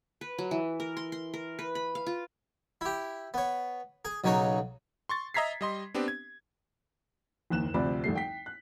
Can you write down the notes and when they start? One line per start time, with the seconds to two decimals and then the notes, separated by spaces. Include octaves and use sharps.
0.21 B4
0.38 F#3
0.51 E3
0.80 A#4
0.97 C6
1.12 C6
1.34 A#4
1.59 B4
1.75 B5
1.95 F5
2.06 F4
2.81 E4 G4
3.34 B3 C#5
4.05 G#4
4.24 B1 C#3 F#3 D#4 C#5
5.09 C6 C#6 A6
5.34 D#5 E5 A#5 G#6 B6 C7
5.61 G3 D#5 C6
5.94 B3 C4 D4 G4
6.08 G#6
7.50 F#1 D#2 F#6 E7
7.74 D2 C3 F3 C4 D5 B5
8.04 G#1 G3 A3 C7
8.15 G5 B6
8.46 F#6